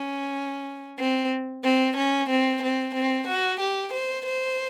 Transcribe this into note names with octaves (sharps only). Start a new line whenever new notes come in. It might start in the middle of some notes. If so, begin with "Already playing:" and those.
Already playing: C#4
C4
C4
C#4
C4
C4
C4
F#4
G4
C5
C5